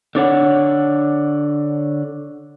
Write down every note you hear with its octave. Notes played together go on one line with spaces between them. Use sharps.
D3 D4 C#5 F#5